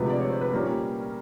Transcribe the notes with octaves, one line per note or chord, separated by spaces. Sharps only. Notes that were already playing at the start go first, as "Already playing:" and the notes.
Already playing: D2 C3 F3 G#3 B4
D5
C#5
C5
B4
A#2 G3 A#3 C#4 A#4